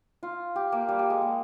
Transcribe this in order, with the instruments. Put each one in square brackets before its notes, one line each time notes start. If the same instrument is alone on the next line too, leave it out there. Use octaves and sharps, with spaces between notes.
[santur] F4
G4
A#3
G3
G3
G#3
A#3